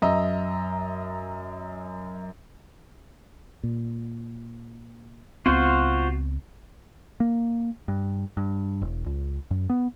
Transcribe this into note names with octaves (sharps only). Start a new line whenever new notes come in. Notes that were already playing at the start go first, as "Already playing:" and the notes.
F#2 D#5 E5 A#5
A#2
C#2 B3 C4 F4 F#4 C5
A#3
G2
G2
E1
C#2
F#2
B3